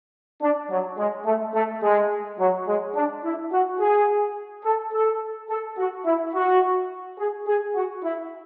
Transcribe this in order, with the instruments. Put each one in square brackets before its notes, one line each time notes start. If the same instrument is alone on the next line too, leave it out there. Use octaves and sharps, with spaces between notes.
[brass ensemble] D4
F#3
G#3
A3
A3
G#3
F#3
G#3
D4
E4
F#4
G#4
A4
A4
A4
F#4
E4
F#4
G#4
G#4
F#4
E4